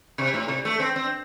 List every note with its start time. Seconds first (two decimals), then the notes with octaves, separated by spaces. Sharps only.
0.18 C3
0.34 A2
0.48 C3
0.65 A3
0.80 C4
0.96 C4